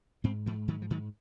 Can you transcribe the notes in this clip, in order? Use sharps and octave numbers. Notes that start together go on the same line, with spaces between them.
G#2 G#3 C4
G#2 F3
G#2 D#3 F#3
F3
G#2 D#3 F#3